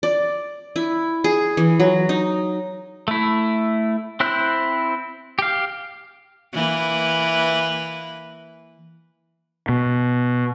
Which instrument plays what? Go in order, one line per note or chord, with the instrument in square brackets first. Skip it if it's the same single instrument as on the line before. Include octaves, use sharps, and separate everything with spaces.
[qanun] D5
E4
G#4
E3
F#3
D#4
[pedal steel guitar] A3 E4
C4 E4 C5 F#6
G4 F5
[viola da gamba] E3 A#3 B4
[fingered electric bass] B2